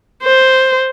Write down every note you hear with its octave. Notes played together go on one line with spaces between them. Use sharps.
C5